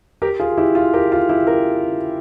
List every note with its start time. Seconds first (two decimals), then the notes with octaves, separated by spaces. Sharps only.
0.22 G4 A#4
0.40 F4 G#4
0.57 E4 G4
0.75 F4
0.94 G4 A#4
1.12 F4
1.29 E4 G4
1.47 G4 A#4